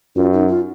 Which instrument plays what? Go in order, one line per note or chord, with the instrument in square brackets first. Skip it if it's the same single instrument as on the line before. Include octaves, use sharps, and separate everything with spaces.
[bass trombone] F#2 [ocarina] F4
[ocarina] D#4
F4